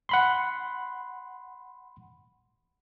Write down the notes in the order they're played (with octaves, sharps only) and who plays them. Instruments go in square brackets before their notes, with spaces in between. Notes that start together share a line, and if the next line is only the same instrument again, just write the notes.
[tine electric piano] F#5 B5 C6